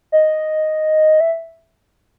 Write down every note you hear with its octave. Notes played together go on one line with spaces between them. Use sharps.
D#5
E5